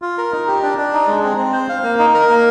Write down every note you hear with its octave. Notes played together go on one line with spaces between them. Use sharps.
F4
A#4
D#4
G4
D4
D4
D#4
G#3
C4
C4
C5
F5
A#3
D#4
A#4
A#3